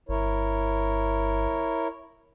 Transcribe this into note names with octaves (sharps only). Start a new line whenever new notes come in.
G1 E4 A#4 C#5